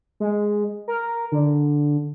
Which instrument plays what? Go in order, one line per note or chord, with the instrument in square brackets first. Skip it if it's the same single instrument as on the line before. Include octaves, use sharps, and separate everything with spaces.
[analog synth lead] G#3
A#4
D3